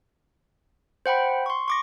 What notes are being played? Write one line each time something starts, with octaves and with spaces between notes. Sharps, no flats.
C5 F#5 G5 B5
C6 C#6
C#6 D6 A#6